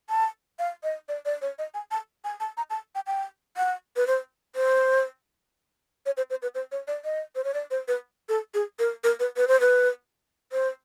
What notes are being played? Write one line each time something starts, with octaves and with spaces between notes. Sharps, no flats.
A5
F5
D#5
D5
D5
C#5
D#5
G#5
A5
G#5
A5
A#5
A5
G5
G5
F#5
B4
C5
C5
C#5
C5
C5
B4
C5
C#5
D5
D#5
C5
C#5
D5
C5
B4
A4
G#4
A#4
A#4
B4
B4
C5
B4
C5